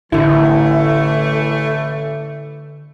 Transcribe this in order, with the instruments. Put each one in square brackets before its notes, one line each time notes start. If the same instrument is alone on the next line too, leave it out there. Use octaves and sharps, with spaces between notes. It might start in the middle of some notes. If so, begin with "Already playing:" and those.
[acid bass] A1 [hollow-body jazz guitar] D3 E4 [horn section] E3 A3